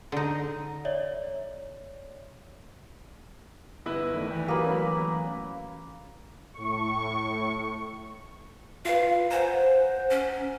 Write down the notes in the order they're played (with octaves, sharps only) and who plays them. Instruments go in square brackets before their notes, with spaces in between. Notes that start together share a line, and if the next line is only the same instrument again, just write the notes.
[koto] D3 D#4
[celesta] C#5 D5 E5
[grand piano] G1 E4 B4 [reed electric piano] B3
[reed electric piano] D#3 A3 D5
[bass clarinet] E3 [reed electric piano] G5
[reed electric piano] F#3 G4 D#6 [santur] A#3 B5
[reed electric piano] F#3 A3 C#4
[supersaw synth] A2 C#6
[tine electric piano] F4 B4 [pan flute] F5
[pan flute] C5 [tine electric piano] F#5 G#5 A#5
[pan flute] C#4